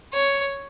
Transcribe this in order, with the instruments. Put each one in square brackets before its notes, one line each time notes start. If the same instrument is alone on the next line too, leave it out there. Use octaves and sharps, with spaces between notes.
[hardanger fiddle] C#5